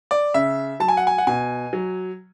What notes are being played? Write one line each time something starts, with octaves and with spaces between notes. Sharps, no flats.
D5
C#3 E5
F#3 A5
G#5
F#5
G#5
F#5
B2 G#5
F#3